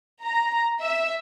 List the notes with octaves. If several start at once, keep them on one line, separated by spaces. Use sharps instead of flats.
A#5
E5